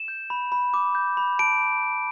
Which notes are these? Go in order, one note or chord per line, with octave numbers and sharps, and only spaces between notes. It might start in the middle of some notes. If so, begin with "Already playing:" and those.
Already playing: E7
G6
B5
B5
D6
G6
B5
A5 D7
D6
G6